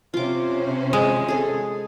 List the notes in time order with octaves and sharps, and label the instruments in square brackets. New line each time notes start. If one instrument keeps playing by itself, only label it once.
[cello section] C3 C#4 C5 [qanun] F4 D6
[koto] G#3
[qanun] G#4 A4